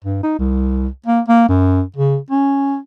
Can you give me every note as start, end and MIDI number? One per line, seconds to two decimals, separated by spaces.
0.04 0.19 43
0.23 0.37 63
0.39 0.87 36
1.06 1.20 58
1.28 1.48 58
1.49 1.81 42
1.96 2.17 49
2.31 2.77 61